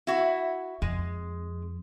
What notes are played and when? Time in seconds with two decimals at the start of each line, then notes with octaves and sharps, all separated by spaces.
0.07 E4 F#4
0.82 F2 G#3